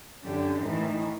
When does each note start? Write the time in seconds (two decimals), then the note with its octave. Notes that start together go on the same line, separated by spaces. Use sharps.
0.24 F#2 D3 G4
0.61 A2 D#3 E3